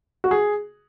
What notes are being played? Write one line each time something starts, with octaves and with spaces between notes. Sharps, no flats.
F#4
G#4